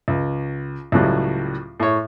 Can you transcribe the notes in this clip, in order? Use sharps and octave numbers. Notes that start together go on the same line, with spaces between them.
C#2
C#2 A2 F#3 G3
A2 C#5